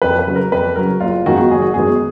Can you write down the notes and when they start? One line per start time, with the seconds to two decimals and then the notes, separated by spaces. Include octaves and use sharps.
0.02 F2 B4
0.19 B4
0.27 C#3 F#3
0.36 A#4
0.52 F2 B4
0.76 C#3 F#3 A#4
1.00 F#1 F4
1.26 F#2 D#3 G#3 B3 F#4
1.51 F#1 G#4
1.62 F#4
1.74 F#2 D#3 G#3 B3 G#4